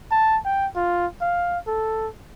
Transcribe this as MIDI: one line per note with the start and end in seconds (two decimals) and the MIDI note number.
0.11 0.38 81
0.45 0.67 79
0.76 1.06 65
1.21 1.59 77
1.67 2.08 69